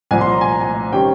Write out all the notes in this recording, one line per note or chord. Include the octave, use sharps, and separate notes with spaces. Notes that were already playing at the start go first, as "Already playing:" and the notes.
C2 A#2 F3 G#5
C6
A#5
G#5
A#5
G#5
C3 D#3 G3 C#4 G5